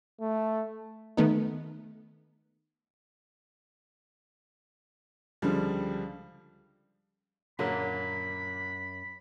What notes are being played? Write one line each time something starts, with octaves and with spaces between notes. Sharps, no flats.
A3
D#3 A3 B3 D#4
C#2 D3 F3 G3
F#2 A#2 D3 A#3 B5